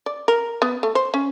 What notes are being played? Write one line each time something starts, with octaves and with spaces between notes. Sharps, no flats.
D5
A#4
B3
A3
C5
C#4